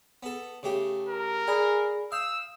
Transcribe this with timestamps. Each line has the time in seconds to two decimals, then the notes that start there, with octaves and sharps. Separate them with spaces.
0.23 B3 A4
0.63 C#3 A3 G4
1.09 A#4
1.48 G#4 D5 G#5 B5
2.12 F5 D#6 E6 G6